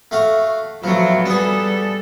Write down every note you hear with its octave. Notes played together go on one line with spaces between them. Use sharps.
A3 F#4 F5
F3 F#3 A3 B3 F#4
G3 B3 G#4 A4